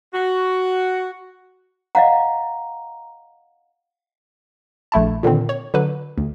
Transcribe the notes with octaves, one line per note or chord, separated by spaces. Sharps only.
F#4
D#5 F5 F#5 A#5
A#1 A3 E4 A5
A#2 D3 D#3 C4
C#5
D3 F#3 B4
D2